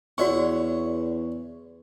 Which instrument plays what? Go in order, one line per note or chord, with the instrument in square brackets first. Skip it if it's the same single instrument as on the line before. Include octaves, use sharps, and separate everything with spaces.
[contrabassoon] E2 [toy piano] F#4 D5 C#6 [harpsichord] C#5 E5 F#5